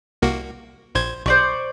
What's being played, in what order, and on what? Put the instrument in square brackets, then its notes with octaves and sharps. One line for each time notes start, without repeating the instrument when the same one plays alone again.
[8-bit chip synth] C2 A#3 F#4
A#1 C5 G#6
[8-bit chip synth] B1 [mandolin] C5 D5 C#6